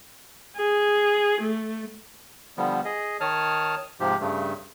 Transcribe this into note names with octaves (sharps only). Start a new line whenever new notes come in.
G#4
A3
D3 F3 G3 B3
G#4 D#5
D#3 C#5 A5 D#6 F6
G#2 C3 F3 G4
G2 C#3 A3